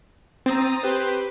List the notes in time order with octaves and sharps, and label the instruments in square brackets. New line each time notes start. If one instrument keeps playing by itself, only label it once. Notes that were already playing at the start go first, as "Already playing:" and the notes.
[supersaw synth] C4 [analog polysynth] A#5 D#6 A6
[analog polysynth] G4 B4 C5